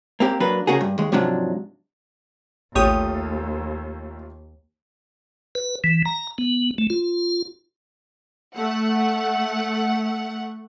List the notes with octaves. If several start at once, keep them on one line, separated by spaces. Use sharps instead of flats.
A#3 C4 G4
F#3 A#3 D4 B4
C#3 A#3 F#4 G#4
G2
D#2 G#3
G#2 C3 F3 F#3 D4
A1 D#2 A3 F4 G4 C#5 D#6
B4
E3
A#5
B3
A3
F4
A3 F#5